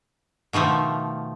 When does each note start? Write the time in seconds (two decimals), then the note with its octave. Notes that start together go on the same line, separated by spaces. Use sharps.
0.53 B2 D#3 F3 A3